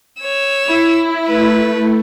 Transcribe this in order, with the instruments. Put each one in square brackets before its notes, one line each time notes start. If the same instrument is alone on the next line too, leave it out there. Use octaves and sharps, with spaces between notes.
[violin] C#5 E6
[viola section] E4
[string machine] A3 [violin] B4